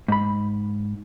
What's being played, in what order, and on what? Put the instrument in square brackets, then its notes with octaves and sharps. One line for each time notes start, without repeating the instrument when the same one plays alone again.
[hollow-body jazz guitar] G#2 B5